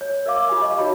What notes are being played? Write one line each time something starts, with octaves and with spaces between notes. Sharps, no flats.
C#5
A#4 D5 E5 F5 D6
F4 G4 D5 G#5 D6
D#5
D#4 F#4 C#5 D#5 B5